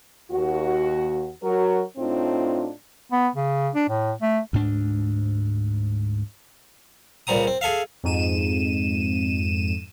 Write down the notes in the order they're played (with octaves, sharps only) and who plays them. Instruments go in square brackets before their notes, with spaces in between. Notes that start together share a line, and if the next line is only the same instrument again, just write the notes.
[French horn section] D#2 F#4
F#3 F#4 A#4
A2 C4 D4 D#4 F4
[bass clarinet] B3
C#3
D4
A2
A3
[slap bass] D2 G#2 D4
[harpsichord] C#2 A#2 G3 C4 A#5 D#6
C4
G#4 A4 E5 F5
[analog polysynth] F2 G#2 D#7 E7